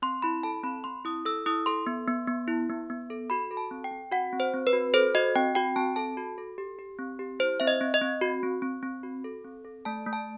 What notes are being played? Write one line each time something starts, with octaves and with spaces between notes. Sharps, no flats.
C4 C6
E4 B5
A4 A5
C4 B5
C4 C6
E4 D#6
A4 E6
E4 D#6
A4 C6
B3
B3
B3
E4
B3
B3
A4
F#4 B5
A4
A5
C4
G5
C4
F#4 F#5
C4
C5
C4
B4
F#4
A4 C5
F#4 D#5
C4 G5
F#4 G5
C4 A5
A4 A5
F#4
A4
G4
G4
C4
G4
E4 C5
C4 E5
D#5
C4
D#5
C4
F#4
C4
C4
C4
F#4
A4
C4
A4
A3 A5
A3
A5